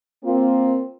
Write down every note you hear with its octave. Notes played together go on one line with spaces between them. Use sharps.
A#3 C4 F4